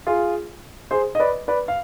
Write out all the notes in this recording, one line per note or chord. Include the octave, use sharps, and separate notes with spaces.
F4 G#4
G#4 C5
D#5
B4 D5
B4 D5
F5